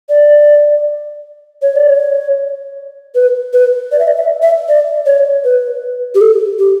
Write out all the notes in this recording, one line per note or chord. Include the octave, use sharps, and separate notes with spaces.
D5
C#5
D5
C#5
B4
B4
D5
E5
D5
E5
E5
D5
C#5
B4
G4
A4
G4